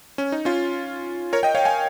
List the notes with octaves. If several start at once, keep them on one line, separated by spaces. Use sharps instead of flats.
C#4
D#4
C#4 F4
A#4 C#5
D#5 G5
C#5 F5
F5 G#5